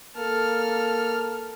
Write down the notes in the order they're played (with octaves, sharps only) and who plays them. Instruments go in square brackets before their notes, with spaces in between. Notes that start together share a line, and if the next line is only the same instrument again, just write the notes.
[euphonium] A#3 [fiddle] A4 F6